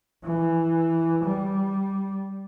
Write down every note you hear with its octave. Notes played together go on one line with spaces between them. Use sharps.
E3
G3